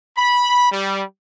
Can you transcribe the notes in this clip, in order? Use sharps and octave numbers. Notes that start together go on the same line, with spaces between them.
B5
G3